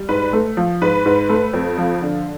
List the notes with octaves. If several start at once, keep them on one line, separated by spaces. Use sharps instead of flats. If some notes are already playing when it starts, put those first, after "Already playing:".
Already playing: G3
G#2 B4
A3
F3
G#2 B4
G#2
A3
F2
F3
D3